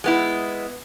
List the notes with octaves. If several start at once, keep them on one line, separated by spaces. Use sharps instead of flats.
G#3 B3 E4